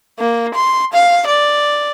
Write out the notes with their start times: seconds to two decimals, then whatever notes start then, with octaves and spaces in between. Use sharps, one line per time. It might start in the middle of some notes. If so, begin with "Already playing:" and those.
0.19 A#3
0.54 C6
0.93 F5
1.27 D5